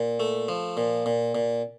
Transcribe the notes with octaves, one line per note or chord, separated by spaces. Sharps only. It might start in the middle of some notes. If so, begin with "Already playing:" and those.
Already playing: A#2
A3
F3
A#2
A#2
A#2